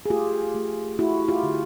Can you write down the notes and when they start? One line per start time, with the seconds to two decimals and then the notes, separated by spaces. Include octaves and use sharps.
0.06 G#4
0.10 A3 F4 G4
0.55 A3
0.99 A3 E4 F#4
1.28 F4 G4
1.43 D3